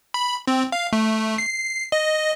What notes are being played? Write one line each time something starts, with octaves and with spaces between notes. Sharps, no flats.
B5
C4
F5
A3
C7
D#5